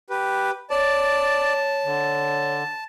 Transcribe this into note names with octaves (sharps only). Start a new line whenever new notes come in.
G4 B4
C#5 D5 A5
D3